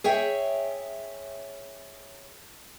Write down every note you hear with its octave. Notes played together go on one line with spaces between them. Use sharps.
G#4 C#5 E5 G5